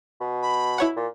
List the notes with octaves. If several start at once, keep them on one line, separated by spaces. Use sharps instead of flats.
B2
B5
E4 C#5 F#5
A#2